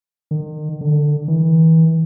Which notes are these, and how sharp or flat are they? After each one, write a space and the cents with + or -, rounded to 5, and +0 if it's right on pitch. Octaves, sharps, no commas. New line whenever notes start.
D#3 -35
D3 +10
E3 -30